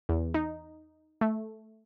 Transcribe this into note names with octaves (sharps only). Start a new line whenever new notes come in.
E2
D#4
A3